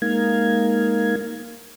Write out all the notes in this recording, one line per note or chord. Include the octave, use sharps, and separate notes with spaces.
G#3 A#3 D#4 A#4 F5 G#6